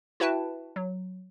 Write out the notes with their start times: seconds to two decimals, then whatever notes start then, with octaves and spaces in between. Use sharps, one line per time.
0.20 E4 F#4 B4 E5 G5 A5
0.76 F#3